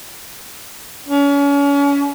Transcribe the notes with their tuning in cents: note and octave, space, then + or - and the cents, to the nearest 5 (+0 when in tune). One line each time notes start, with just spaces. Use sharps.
C#4 +35